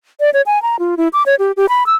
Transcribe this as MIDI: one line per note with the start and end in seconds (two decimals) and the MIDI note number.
0.20 0.30 74
0.34 0.42 73
0.46 0.61 80
0.62 0.76 82
0.79 0.95 65
0.97 1.08 64
1.13 1.23 86
1.26 1.35 73
1.39 1.52 67
1.57 1.66 67
1.69 1.86 83
1.86 1.96 88